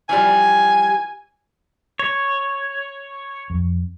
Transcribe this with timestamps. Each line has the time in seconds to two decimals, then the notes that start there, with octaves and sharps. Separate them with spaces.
0.09 E3 F3 G3 G#5
1.99 C#5
3.50 F2